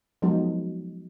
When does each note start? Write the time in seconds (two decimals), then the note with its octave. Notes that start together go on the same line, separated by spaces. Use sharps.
0.22 F3 F#3 G#3 B3 D#4